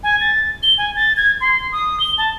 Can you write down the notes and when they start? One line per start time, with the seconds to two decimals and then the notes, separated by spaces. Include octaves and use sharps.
0.03 G#5
0.21 A6
0.63 G7
0.78 G#5
0.96 A6
1.17 G#6
1.41 C6
1.72 D#6
2.00 G7
2.18 A5